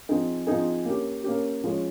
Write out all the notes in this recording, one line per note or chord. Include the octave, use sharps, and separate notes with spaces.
F3 C4 D#4 G#4
F3 C4 D#4 G#4
A#3 C#4 G4
A#3 C#4 G4
F3 G#3 C#4